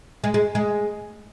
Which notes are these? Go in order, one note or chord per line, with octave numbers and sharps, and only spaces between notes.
G#3
G#3
G#3